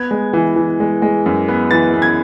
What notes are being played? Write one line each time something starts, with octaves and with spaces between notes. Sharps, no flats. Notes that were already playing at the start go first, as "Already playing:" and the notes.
Already playing: B3 G#6
G#3
E3
E3
G#3
G#3
F#2
B3
E3 A6
B3
G#6